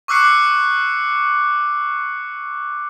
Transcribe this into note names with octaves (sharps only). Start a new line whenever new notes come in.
C#6 D6 E6 F#6 C7 C#7